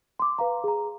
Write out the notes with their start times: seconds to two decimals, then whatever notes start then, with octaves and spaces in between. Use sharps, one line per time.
0.20 C6 D6
0.39 B4 F5 A#5
0.64 G#4 A#5